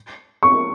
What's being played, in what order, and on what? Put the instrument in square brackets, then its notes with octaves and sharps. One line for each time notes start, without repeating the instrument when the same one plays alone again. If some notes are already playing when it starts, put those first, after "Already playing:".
[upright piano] C#6